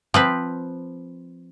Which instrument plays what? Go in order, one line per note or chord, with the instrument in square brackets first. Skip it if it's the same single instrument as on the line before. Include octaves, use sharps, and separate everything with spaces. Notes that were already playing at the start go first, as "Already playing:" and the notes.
[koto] F3 C4 B4